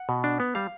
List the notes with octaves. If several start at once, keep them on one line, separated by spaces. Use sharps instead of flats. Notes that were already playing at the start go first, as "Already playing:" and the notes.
Already playing: F#5
B2
D4
B3
G3 F5